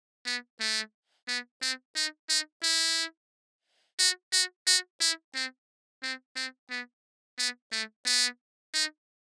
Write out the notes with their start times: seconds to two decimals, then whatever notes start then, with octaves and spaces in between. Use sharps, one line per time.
0.26 B3
0.60 A3
1.28 B3
1.61 C4
1.96 D#4
2.29 D#4
2.63 E4
3.99 F#4
4.33 F#4
4.67 F#4
5.01 E4
5.35 C4
6.03 C4
6.36 C4
6.70 B3
7.38 B3
7.72 A3
8.06 B3
8.74 D#4